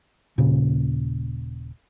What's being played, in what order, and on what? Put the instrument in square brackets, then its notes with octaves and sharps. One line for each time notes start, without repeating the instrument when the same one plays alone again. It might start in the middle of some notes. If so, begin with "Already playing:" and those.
[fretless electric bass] D#1 A#2 C#3